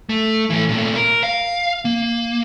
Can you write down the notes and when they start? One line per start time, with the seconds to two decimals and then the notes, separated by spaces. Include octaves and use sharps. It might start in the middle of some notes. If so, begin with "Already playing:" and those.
0.09 A3
0.50 E3 A3
0.69 A#2 A3
0.96 A#4
1.24 F5
1.85 A#3